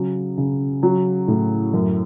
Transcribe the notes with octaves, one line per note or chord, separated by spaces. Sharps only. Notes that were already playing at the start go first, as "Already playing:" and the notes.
Already playing: C#3 F#3
C#3
F#3
A2
F#2